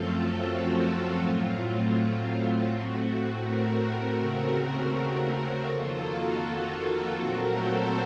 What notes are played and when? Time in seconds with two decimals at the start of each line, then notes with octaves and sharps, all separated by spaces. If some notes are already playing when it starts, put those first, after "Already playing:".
Already playing: F#2 F3 A3 C4 F4 A4
0.40 F#4
1.15 A2 F#3 A3 C4 F4
2.66 A2 A3 C4 F#4
3.40 F#4 A#4
4.16 D#2 C#3 A3 C4
5.66 F2 D#3 A#3 F4 A4
6.04 F#4
6.79 F4 A4
7.16 A#2 F#3 A3 C4 F#4 A#4
7.54 A4 C5